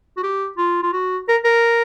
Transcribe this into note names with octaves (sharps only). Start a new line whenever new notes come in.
F#4
G4
F4
F4
F#4
A#4
A#4